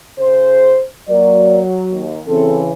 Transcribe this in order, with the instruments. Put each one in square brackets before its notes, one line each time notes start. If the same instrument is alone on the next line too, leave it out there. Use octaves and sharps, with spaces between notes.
[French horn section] C#3 G#4 C5
[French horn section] F#3 [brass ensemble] A#3 A#4 D5
[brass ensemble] D#2
[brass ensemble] C#3 E3 [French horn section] C4 A4